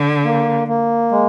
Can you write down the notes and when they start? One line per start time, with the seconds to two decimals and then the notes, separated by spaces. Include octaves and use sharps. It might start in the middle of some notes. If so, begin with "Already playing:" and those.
Already playing: D3
0.25 A#3
0.68 A#3
1.12 G#3